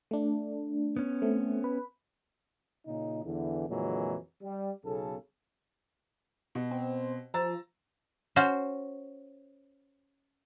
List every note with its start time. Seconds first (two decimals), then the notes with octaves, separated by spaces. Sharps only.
0.11 A3 D4
0.96 B3 C#4
1.22 A3 C4
1.64 B4
2.87 A#2 C#3 D#4
3.25 E2 D3 E3
3.69 F2 A#2 D3 E3 F#3 G#3
4.42 G3
4.85 B1 C#3 A4
6.55 B2
6.71 C4
7.34 F3 A#5 E6 A6
8.36 C#4 F#4 C5